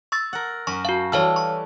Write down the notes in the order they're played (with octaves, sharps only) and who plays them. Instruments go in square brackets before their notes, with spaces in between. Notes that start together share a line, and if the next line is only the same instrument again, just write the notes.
[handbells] C#6 E6 A6
[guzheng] A#4 F#5
[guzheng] F#2 F#4 [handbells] C#6
[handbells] F#4 F5 [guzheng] A5
[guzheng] E3 G3 A4 [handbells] C#5 F5 F6
[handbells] C#6